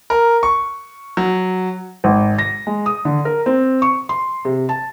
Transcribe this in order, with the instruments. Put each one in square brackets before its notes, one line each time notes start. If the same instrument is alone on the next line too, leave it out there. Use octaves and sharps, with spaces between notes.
[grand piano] A#4
C#6
F#3
[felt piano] G#1
A#6
G#3
D#6
D3
A#4
C4
C#6
C6
C3
A5